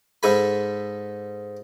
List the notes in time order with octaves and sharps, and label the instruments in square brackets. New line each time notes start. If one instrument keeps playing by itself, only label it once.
[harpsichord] G#2 A4 G#5 B5